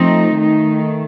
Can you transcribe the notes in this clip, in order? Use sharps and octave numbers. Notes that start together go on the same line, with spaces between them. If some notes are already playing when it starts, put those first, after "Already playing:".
Already playing: F3 A3 C4 D#4
D#3 A3 D#4